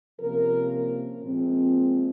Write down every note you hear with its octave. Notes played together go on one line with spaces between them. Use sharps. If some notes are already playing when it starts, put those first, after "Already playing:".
C3 F3 A#3 C#4 A#4
A#2 F3 G#3 C4